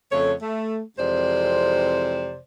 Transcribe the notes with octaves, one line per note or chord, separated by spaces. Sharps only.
F2 C#3 A3 C#5
A3
F2 C3 E3 G#3 C5 D5